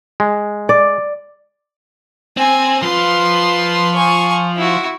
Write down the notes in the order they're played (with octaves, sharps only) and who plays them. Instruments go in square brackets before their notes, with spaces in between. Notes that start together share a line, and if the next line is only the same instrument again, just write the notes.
[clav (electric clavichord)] G#3
[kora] D5
[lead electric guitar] C4 [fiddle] G#5
[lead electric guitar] F3 F4 [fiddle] B4 C6
[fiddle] G#5 C#6
E4 F#4